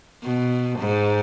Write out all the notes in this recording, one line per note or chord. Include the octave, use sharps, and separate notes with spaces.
B2
G#2